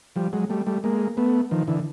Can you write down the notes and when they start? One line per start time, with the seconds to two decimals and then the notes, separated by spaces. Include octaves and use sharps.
0.16 F3 G3
0.33 F#3 G#3
0.50 G3 A3
0.66 G3 A3
0.84 G#3 A#3
1.17 A3 B3
1.51 D#3 F3
1.68 D3 E3